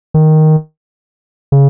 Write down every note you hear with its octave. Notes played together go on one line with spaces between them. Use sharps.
D#3
C#3